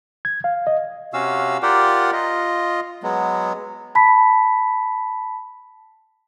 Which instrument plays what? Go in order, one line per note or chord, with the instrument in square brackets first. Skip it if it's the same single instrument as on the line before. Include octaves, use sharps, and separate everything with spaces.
[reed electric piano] G#6
F5
D#5
[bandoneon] C3 C#4 F#4 F5 E6
F4 G4 A#4 D5 F#5 G5
F4 D#5
F#3 G#3 B3
[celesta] A5 B5 B6